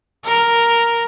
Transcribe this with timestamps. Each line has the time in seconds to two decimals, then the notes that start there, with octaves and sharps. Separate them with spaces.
0.24 A#4